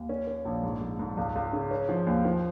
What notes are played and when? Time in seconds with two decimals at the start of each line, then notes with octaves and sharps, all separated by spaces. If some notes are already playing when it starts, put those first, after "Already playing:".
Already playing: D#2
0.09 C#4
0.27 C#4
0.45 A#1
0.63 G#2
0.81 G#2
0.99 G#2
1.17 C#2
1.35 C#2
1.53 C#3
1.71 C#4
1.89 F3
2.07 D#2
2.25 F3